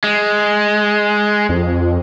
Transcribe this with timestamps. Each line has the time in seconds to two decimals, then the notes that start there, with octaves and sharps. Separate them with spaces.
0.04 G#3
1.49 F2